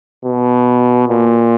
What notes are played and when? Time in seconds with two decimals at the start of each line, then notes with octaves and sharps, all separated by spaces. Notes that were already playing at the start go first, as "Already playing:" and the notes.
0.25 B2
1.08 A#2